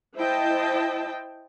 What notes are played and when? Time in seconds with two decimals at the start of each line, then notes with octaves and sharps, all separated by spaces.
0.18 E4 C5 D#5 G5 A5